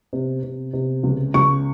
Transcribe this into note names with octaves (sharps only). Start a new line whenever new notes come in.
C3
C3
C3
C#2
C#2 C#6